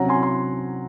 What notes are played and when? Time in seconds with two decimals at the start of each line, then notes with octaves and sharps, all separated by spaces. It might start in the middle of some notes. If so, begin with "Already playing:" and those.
Already playing: C3 F#3 C#4 F#5 A#5
0.09 G#5 C6
0.23 C6